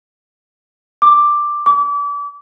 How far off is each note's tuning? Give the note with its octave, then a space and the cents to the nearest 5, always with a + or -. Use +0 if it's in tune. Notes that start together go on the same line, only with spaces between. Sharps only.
D6 +5
D6 -35